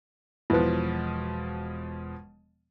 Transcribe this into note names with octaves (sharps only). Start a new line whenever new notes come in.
E1 B2 F3 E4 B4